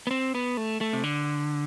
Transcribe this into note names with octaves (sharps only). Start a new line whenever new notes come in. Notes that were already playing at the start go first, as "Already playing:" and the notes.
B3
C4
B3
A3
A3
C3
D3